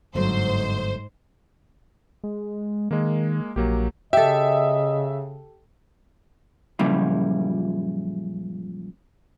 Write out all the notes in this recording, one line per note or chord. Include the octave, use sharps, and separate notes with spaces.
G1 G#2 F#3 A3 C5
G#3
D#3 G#3 A#3
A#1 F#3 A#3 G4
C#3 G4 A4 D#5 E5
F#2 A#2 C#3 F3 G3 E4